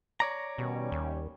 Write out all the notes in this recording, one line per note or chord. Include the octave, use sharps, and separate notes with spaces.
C#5 D5 A#5
B2 D#3 G3 C#4
D#2